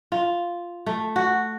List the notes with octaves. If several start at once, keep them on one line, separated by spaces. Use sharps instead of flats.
F4
A3
F#4